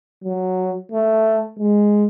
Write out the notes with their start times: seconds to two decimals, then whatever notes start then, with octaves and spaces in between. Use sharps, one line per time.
0.24 F#3
0.92 A3
1.59 G#3